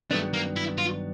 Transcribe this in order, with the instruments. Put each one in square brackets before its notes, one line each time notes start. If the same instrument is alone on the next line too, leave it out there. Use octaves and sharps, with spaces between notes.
[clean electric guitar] G2 D#3 F#3 B3 D4 [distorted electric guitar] A3
[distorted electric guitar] A#3
E4
F4